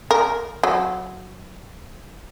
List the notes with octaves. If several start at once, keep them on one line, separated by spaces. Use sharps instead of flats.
A#4
F#3